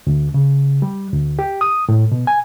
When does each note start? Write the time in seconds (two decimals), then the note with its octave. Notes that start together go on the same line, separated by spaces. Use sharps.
0.07 D2
0.34 C#3
0.82 G3
1.13 D2
1.39 G4
1.61 D#6
1.89 A2
2.12 B2
2.27 G#5